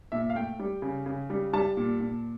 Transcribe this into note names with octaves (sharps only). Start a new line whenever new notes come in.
A#2 E5
F5
A3 G5
G3
C#3
C#3
G3
G3 A5
A#2
A#2